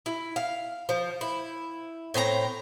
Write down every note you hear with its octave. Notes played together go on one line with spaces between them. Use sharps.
E4
F5
F3
E4
A2 C4 D4 A#5